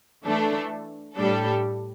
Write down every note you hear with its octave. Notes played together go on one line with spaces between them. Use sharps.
E3 A3 D4 A4
A2 G3 D4 A4